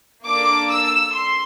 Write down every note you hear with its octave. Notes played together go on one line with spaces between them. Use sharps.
A#3 D4 A4 D6
E6
C6